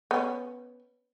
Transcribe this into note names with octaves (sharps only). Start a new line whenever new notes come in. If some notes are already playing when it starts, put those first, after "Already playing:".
B3 C#4